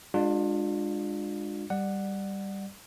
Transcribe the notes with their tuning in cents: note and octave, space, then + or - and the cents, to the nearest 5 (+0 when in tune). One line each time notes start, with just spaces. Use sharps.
G#3 -15 D4 +25 F4 +25
G3 +0 D5 +20 F#5 +0